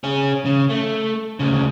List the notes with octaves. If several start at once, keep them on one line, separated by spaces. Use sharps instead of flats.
C#4 G#4
C#3
A3
D2 C#3